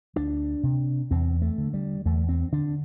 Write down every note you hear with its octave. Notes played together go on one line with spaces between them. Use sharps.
D2 D4
C3
E2 C4
A3
D3
G3
E2 A3
C4
D3 D4